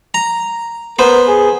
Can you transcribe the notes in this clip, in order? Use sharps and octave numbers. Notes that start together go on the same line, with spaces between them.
A#5
B3 A#4 C5
G#4